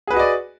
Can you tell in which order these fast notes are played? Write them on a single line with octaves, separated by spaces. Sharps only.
G#4 B4 F#4 D#5 D5